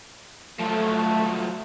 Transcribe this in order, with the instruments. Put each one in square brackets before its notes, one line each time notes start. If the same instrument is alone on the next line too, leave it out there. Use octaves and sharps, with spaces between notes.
[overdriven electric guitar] F3 F#3 [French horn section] A3